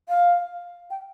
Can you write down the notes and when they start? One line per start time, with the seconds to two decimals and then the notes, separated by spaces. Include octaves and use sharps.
0.09 F5
0.90 G5